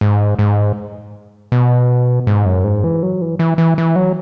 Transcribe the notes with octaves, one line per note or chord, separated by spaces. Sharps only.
G#2
G#2
B2
G#2
F#2
G#2
E3
F#3
E3
E3
E3
E3
F#3